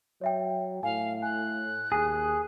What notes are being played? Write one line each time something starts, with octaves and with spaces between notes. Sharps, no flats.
F#3 C#5 E5 G5
A2 F5 G#5
G#5 F#6
D#2 G#4